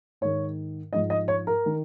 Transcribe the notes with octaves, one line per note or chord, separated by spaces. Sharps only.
G#2 D#3 C#5
G#2 F3 D#5
D#5
C#5
A#4
D#3